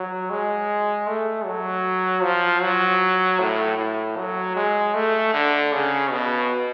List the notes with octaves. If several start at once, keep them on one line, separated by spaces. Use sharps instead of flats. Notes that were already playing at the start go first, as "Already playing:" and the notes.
Already playing: F#3
G#3
A3
F#3
F3
F#3
A2
A2
F#3
G#3
A3
D3
C#3
B2